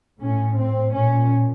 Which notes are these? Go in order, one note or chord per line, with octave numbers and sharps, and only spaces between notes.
A2 C#4
C4
A#2 C#4